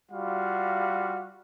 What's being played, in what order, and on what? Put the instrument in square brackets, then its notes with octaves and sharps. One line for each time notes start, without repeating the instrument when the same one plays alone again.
[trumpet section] G3 F4 F#4 F5